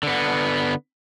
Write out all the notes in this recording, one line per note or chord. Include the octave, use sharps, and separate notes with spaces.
D3 B3